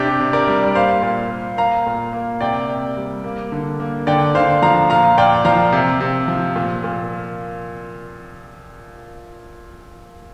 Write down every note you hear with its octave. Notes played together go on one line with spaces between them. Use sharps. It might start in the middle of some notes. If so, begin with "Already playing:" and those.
Already playing: C3 D4 G4
C3
A#4 D5
G3
D5
A#3 C5 F5
A#2
A#3
A#3 F5 A#5
A#2
A#3
C3 D5 G5
C3
G3
A#3
D3
A#3
D3 D5 G5
D3 C5 F5
F3 F5 A#5
A#2 F5 A#5
A#2 D5 G5
F3 F5 A#5
C3
C3
F3
A#2
A#2